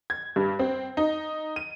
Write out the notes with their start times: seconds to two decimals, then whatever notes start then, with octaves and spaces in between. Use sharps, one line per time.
0.10 G#6
0.36 G2
0.59 C4
0.97 D#4
1.56 D#7